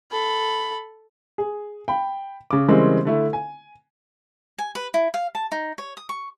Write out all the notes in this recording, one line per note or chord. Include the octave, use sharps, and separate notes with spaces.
A4 B5
G#4
G5 B5
C#3 D6
C#3 E3 G3 G#3 A#3 C4
D3 A3 E4
G#5
G#5
B4
E4
F5
A5
D#4
C#5
D#6
C#6